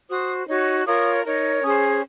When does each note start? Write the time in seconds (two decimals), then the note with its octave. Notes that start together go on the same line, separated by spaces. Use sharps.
0.10 F#4 C5 D#6
0.48 D#4 F#4 C#5
0.86 F4 A#4 C#5 D#6
1.25 D#4 A#4 C#5
1.63 C#4 G#4 C5 D#6